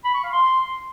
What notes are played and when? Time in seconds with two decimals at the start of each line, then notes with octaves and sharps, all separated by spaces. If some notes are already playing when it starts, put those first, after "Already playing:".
0.05 B5
0.14 C#6
0.23 F5
0.33 C6